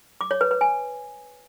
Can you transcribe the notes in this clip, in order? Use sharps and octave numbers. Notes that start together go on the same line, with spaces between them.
D6
C#5
B4
B4
G#5